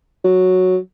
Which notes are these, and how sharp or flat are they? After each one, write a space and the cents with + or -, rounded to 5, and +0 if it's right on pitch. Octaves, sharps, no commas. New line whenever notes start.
F#3 -5